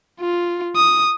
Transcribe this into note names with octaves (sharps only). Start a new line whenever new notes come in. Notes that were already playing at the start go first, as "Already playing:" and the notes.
F4
D#6